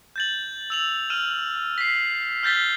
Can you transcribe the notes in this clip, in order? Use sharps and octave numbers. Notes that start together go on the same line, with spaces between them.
G6 A6 F#7
E6 F7 F#7
F6 D#7 E7
B6 C7
F6 G6 A6 B6 G7